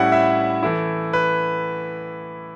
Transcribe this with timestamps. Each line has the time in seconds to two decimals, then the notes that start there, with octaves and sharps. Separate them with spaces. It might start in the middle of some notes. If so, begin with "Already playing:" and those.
Already playing: A2 G3 C#4 E4 F#5
0.12 E5
0.63 E3 A3 E4
1.13 B4